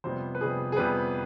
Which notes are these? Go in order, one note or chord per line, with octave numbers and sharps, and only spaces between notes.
F2 C3 G3 B3 C5
B4
F2 C3 G3 B3 G#4
G#4
F2 C3 G3 B3 B4